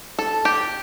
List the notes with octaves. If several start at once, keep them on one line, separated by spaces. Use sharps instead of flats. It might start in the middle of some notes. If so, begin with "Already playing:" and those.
A4
G4